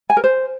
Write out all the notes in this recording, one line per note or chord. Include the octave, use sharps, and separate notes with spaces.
G#5
A#4
C5